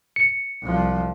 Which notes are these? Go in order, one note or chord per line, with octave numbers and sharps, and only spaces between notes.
C#7
C2 F3